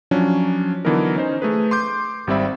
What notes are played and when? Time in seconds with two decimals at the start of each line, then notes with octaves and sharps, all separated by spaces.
0.11 F3 F#3 C#4 D4
0.85 D3 E3 F#3 B3 D#4 A#4
1.16 C#4 D#4 C5
1.42 A3 G#4 B4
1.71 C6 D6 G6
2.27 G#1 G3 C4 D5 E5 B5